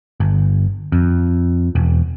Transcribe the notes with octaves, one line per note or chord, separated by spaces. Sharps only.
G1
F2
E1